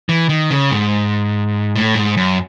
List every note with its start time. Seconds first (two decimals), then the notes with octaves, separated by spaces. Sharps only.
0.09 E3
0.29 D#3
0.51 C#3
0.71 G#2
1.76 A2
1.95 G#2
2.17 F#2